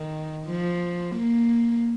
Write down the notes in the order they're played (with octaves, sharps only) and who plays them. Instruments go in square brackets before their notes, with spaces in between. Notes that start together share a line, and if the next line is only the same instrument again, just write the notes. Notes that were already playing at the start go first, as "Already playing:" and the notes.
Already playing: [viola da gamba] D#3
F3
A#3